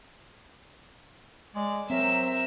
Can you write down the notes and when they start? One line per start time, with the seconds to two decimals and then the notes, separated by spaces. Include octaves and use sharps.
1.55 G#3 D5
1.90 F#3 C4 A#4 C5 E5